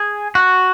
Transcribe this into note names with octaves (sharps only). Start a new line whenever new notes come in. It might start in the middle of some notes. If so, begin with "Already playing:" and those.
Already playing: G#4
F#4